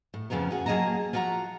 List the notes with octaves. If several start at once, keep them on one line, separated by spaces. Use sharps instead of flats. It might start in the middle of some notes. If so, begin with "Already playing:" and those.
A2
F2 C#3 F3 B3 A#4
F#4 G#4
F#3 A#3 G#4 D#5 A5 A#5
F3 F4 F#4 G#5 A#5